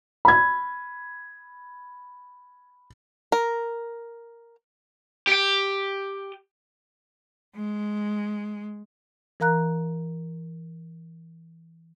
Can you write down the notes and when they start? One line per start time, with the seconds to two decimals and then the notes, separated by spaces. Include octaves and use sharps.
0.25 B5 G#6
3.32 A#4
5.27 G4 G5
7.56 G#3
9.40 E3 A#4 F5 A#5 F#6